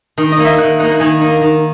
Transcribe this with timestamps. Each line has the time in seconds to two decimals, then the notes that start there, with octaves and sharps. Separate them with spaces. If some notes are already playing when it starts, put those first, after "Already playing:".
0.18 D#3
0.32 D#5
0.39 A#3 D#4
0.45 E5
0.58 D#3 F#5
0.79 A#3 D#4 F#5
0.92 F#5
1.00 D#3 G#5
1.21 A#3 D#4
1.41 D#3